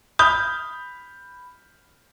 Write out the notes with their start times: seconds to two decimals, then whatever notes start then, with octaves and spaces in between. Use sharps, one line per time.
0.19 B5 D#6 F6 G6